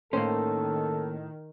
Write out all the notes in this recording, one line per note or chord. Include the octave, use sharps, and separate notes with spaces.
A2 D#3 A#3 C#4 A4 C5